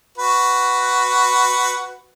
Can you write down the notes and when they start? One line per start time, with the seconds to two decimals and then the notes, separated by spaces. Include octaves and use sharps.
0.18 F#4 B4